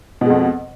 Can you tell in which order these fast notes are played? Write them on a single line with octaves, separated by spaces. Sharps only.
B2 G#3 F2